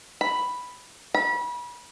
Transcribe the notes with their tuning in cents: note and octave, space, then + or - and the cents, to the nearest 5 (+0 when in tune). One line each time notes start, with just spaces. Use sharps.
B5 +0
B5 -30